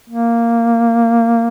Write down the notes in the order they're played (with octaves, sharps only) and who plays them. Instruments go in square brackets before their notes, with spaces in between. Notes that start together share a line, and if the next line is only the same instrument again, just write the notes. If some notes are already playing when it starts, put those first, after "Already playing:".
[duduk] A#3